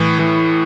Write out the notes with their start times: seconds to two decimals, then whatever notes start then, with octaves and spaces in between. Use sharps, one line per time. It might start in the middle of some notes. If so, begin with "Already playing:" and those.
Already playing: A2 E3
0.19 E3